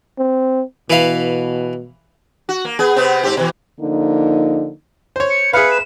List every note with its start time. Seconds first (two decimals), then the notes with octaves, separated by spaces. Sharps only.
0.18 C4
0.90 B2 E3 F5
2.49 F#4
2.65 A#3
2.79 B3 G#4
2.96 C3 B3 C4
3.23 G#2 C4 G4
3.37 B2 E3
3.79 D3 F3 A#3 D#4
5.16 C5 C#5
5.30 C#7
5.53 G#4 B4 E5 F5 C#7
5.71 E7